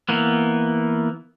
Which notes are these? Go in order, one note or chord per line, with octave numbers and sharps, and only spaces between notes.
E3 A#3 B3